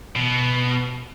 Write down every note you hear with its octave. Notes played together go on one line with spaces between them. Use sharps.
B2